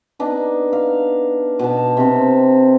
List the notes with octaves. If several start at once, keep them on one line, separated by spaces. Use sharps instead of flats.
B3 D4 D#4
F5
B2 B3 A5
C3 C4